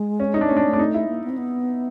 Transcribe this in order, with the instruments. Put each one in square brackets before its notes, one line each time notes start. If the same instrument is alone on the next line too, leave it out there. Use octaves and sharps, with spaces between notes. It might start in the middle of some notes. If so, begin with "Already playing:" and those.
Already playing: [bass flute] G#3
[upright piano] C#4
D#4
D4
[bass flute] A3 [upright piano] C#4
[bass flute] G#3 [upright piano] D4
[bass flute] A3
[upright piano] D4
D#4
E4
[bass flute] A#3
B3
C4
B3